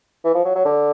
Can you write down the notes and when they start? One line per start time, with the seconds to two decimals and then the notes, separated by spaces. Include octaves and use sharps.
0.24 E3
0.35 F3
0.45 F#3
0.55 F#3
0.65 D3